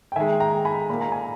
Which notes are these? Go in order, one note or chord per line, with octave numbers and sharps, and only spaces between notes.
G5
D#3 G#3 E5 G#5
G5 A#5
G#5 B5
A#2 A#3 B5
A#5
G#5